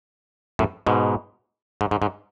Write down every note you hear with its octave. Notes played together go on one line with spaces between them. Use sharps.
F#2 A2
G#2 B2
G#2
G#2
G#2